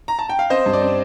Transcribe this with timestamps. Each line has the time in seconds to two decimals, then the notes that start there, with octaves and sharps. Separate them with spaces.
0.08 A#5
0.19 A5
0.29 G5
0.39 F5
0.50 C4 C5 D#5
0.66 G2
0.73 D5
0.82 C4